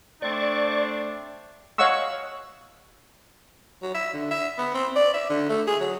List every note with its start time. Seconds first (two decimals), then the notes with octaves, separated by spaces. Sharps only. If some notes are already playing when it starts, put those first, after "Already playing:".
0.22 A3 C4 D4 D5 C#6
1.78 C#5 D#5 F5 F#5 C#6 E6
3.82 F#3
3.94 E5
4.13 D3
4.31 E5
4.58 B3
4.74 C4
4.96 D5
5.13 E5
5.29 D3
5.49 A3
5.67 G#4
5.80 F#3